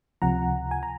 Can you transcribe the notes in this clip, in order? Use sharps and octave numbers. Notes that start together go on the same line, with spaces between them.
C#2 C3 F3 F#5 A#5
G#5
A#5